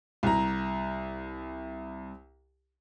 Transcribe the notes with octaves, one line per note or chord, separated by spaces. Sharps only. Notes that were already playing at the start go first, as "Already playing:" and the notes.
C2 A#5